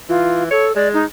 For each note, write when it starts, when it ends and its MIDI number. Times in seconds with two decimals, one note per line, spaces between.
0.09 0.47 52
0.09 0.43 65
0.51 0.75 69
0.51 0.66 73
0.76 1.03 56
0.76 0.88 74
0.94 1.05 63